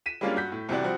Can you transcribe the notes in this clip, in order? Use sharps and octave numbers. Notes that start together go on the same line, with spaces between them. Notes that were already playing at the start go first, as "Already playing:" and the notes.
B6 D#7 E7
G3 G#3 A#3 C#4 D4 F4
G2 F#4 G6 B6
A2
C2 C3 E3 F#4 G4 D5
F3 G3 C4 F#4